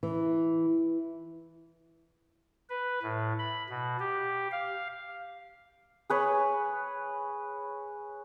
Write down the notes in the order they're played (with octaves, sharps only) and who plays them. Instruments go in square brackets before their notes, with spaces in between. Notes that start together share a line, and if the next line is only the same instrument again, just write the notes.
[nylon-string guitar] E3
[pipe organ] B4
A2
B5
B2
G4
F5
[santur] G#4 B4 C#5